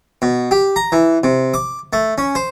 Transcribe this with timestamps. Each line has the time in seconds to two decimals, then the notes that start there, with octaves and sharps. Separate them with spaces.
0.22 B2
0.51 G4
0.76 A#5
0.92 E3
1.24 C3
1.54 D6
1.93 A3
2.18 C#4
2.35 C5